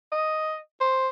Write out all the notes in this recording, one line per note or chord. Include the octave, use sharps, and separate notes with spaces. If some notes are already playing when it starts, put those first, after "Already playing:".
D#5
C5